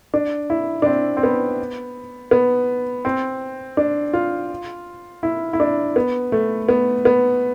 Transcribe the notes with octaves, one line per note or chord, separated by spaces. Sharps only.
D4
E4
D4
C4
C4
B3
B3
C4
D4
F4
E4
E4
D4
B3
A3
B3
B3